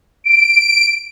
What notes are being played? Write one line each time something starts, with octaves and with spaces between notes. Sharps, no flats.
D7